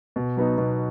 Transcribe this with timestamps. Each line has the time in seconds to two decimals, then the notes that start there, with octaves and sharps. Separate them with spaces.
0.16 B2
0.37 F#3 B3 D#4
0.58 B2